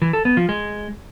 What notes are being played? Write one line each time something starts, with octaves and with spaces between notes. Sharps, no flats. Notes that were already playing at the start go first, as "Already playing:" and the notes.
E3
A4
B3
F3
G#3